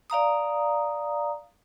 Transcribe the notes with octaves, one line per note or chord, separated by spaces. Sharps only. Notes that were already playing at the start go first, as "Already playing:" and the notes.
D5 F5 A#5 D#6